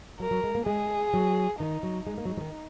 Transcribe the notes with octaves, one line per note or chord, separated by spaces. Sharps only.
F#3 A#4
F#3
G#3
A#3
G#3 G#4
F#3
D#3 D#4
F#3
G#3 D#4
A#3
F#3
G#3
F#3
D#3